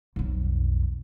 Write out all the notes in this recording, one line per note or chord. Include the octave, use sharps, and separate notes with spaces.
B1 F2